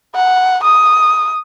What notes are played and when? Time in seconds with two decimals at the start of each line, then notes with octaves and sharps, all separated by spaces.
0.15 F#5
0.64 D#6